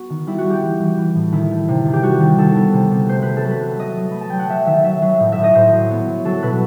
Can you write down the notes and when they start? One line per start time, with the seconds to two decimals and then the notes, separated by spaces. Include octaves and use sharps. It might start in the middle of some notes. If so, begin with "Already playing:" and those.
Already playing: B3 F#4
0.10 D#3
0.27 G3 E4
0.38 F#4
0.45 G3
0.50 G4
0.63 E3
0.80 E3
0.97 E3
1.15 A2
1.33 D#3 E4
1.50 A3
1.68 C3
1.85 D#3
1.93 G4
2.03 G3 F#4
2.20 D#3
2.38 D#3 A4
2.56 B3
2.73 C3
2.91 C3
3.08 A3 C5
3.22 A3 B4
3.37 A4
3.44 F#3
3.51 B4
3.61 F#3
3.79 A3 D#5
3.97 F#3
4.11 A3 B5
4.21 A5
4.30 F#3 G5
4.39 F#5
4.49 F#3 E5
4.66 D#3 E5
4.84 F#3 E5
5.02 F#3
5.20 A2
5.32 E5
5.38 A2
5.44 D#5
5.55 A2 C5
5.73 F#3
5.90 B3
6.07 F#3
6.25 F#3 A4
6.42 B2 B4